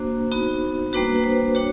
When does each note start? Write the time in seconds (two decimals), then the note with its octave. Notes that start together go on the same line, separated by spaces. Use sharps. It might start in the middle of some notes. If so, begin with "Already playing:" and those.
Already playing: A#3 D4 F#4 C5
0.32 B3 D#4 F#4
0.93 G3 A#3 D4 F#4 B4
1.16 B4
1.24 C5
1.55 D4 F#4 C#5